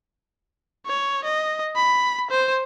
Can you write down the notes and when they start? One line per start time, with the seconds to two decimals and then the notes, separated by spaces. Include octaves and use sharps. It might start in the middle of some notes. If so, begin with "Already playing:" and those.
0.86 C#5
1.24 D#5
1.76 B5
2.30 C5